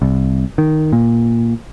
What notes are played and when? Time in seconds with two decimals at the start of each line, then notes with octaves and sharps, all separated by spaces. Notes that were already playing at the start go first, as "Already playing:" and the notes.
0.02 C2
0.58 D#3
0.93 A#2